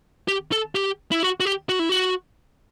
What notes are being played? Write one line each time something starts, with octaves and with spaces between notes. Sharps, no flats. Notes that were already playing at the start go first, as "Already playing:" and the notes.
G4
A4
G4
E4
F#4
F#4
G4
F#4
E4
F#4